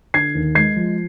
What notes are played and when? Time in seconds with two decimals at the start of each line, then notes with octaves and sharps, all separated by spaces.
0.14 D3 G#6 C7
0.35 D#2
0.55 G#3 G#6 C7
0.76 F3